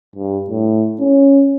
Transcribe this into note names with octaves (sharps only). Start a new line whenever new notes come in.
G2
A2
C#4